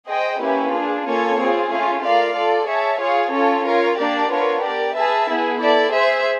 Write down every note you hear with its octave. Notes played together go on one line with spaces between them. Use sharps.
G#4 C5 D#5 G5
A#3 C#4 E4 G4 B4
D4 F4 G#4
A#3 C#4 F4 A4 C#5
C4 F4 G#4
A3 C#4 F4
F4 A#4 D5 F5
F4 A4 D5
G#4 C#5 E5 A5
F4 G#4 C#5 F5
C#4 F4 A4 C#5
F4 A#4 C#5
A#3 D4 G4 A#4 D5
B3 D4 F4 A#4 C#5
G4 A#4 D5
G#4 B4 E5 A5
B3 E4 G#4
E4 A4 D5
G#4 C5 E5